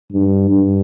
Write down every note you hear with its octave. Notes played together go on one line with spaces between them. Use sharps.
G2
G2